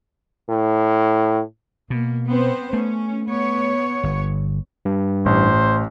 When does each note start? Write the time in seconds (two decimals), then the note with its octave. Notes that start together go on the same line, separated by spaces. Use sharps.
0.49 A2
1.90 B2 A#3
2.28 B3 C4 C5
2.73 A3 C#4
3.26 B3 C#5
4.03 G1
4.85 G2
5.26 A1 A2 C5